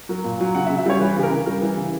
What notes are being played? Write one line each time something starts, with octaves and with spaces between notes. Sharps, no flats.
F#3 A#4
A#2
F#3
C#3 F#5
E5
C#3
E5
G3 C#5
E3 B4
C#3 G4
A#4
C#3
G3 A#4
E3
C#3